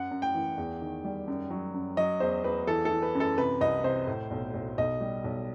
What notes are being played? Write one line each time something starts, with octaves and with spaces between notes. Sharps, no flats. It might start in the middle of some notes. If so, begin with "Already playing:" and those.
Already playing: F#2 F#5
F#2
G5
E3
E2
D#3
G3
F#2
F#3
F#2
F#3 D#5
E2 C5
E2 B4
E3 A4
A4
E3
B4
F#2
A4
C3 B4
C2 D#5
C3 C5
A2
B1
B1
B1 D#5
G3
B1